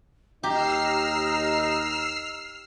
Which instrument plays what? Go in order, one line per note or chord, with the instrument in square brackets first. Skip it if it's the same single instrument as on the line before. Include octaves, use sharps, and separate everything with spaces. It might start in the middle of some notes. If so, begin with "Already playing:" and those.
[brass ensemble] D#2 D#4 D#5 [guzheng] G4 [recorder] A#5 [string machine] E6 F6 C7